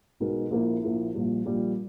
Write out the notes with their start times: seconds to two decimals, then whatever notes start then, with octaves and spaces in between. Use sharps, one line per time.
0.20 B1 B2 G#3 D#4 A#4
0.50 A#1 A#2 A#3 E4
0.82 A#1 A#2 A#3 E4
1.14 A#1 A#2 G3
1.46 A#1 A#2 G3